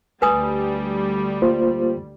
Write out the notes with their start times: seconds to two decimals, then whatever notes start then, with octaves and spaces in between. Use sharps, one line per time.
0.22 D2 G3 B4 G#5 D#6
1.42 A#3 F4 C5